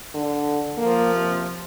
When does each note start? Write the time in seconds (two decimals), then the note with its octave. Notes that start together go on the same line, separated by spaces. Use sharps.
0.14 D3
0.77 F3 A#3
1.15 C3